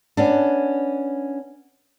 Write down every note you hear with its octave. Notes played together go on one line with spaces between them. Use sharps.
B3 C#4 D4